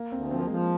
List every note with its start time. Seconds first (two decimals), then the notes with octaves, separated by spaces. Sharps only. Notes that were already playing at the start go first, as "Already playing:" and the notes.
Already playing: A#3
0.12 D2 C4
0.31 F3 C4
0.39 A#3
0.47 G#3
0.50 F3 A#3